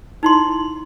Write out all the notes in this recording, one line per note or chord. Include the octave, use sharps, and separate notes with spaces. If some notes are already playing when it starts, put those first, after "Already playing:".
D#4 E4 C6